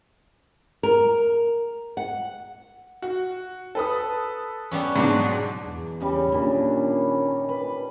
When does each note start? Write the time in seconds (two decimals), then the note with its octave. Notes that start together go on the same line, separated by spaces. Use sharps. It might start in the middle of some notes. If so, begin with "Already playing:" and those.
0.83 A#4
1.97 F#5
3.02 F#4
3.75 A4 B4 D#6
4.72 G3 B3 C#4
4.96 G#2 B2 F#3 D4
5.63 E2
6.00 C#3 G3
6.32 A#2 D#3 C#4 D4
7.49 B4